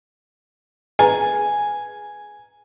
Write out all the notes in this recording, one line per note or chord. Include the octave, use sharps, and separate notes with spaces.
G#4 B4 G#5 A#5